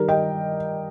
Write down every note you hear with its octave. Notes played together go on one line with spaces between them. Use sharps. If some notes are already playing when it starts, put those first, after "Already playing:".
Already playing: D#3 G3 D#4 G4 A#4
D#5 G5